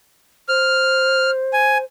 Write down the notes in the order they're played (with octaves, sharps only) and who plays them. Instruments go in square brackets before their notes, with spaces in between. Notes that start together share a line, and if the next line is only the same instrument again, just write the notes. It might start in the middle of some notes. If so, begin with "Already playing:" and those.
[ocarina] C5 [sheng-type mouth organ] F6
[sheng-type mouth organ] G#5